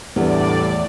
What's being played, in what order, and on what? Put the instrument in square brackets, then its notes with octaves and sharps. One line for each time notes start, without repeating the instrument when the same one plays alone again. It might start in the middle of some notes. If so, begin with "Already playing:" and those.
[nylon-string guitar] E2 [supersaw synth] A2 D5 [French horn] D3 [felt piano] G3 B4